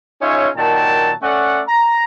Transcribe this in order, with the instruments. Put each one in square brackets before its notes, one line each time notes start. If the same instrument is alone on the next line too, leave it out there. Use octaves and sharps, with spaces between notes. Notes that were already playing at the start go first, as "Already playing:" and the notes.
[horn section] C#4 D#4 F4 G#4 C#5 E5
A#2 D#3 F#3 G5 A5
A3 C#4 D5 E5 F#5
A#5